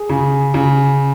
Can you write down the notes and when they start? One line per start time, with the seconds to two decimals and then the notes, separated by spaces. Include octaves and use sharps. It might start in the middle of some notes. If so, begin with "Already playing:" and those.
Already playing: G#4
0.09 C#3
0.54 C#3